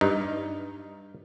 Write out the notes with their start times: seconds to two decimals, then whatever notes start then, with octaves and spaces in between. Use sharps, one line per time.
0.01 G2 D#4